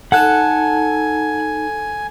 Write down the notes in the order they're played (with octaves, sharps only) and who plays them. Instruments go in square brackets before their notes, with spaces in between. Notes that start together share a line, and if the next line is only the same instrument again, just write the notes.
[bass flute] D#4 [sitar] A4 [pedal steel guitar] F#5 F#6 [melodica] G#5